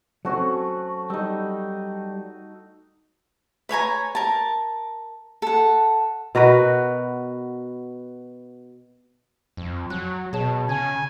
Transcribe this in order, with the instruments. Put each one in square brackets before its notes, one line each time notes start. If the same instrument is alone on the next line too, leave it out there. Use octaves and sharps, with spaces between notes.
[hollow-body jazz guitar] F#3 C4 C#4 [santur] A3 F#4
[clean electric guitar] G3 [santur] D#4 E6
[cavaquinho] B4 C#5 G#5 A#5
A#4 A5
A4 F#5
[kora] B2 F#4 A#4 B4
[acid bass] F2
[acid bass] F#3 [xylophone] F#6
[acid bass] B2 [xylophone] G#4 C#5 A5
[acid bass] C#3 [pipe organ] G#5